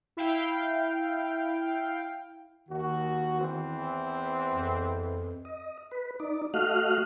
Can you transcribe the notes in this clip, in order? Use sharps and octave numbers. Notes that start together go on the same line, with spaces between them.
E4 F5 G5
D#2 D#3 F#4
E2 E3 C4
F2
D#5
B4
D#4 D5
A3 F#4 D#5 F5 F6 F#6